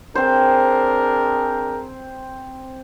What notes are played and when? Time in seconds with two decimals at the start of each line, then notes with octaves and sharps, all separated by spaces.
0.15 C4 D4 G#4 A#4 C5